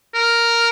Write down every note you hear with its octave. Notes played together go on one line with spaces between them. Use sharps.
A#4